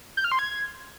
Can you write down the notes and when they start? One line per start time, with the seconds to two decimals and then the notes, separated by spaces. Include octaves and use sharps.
0.17 G6
0.24 F6
0.32 C6
0.39 G#6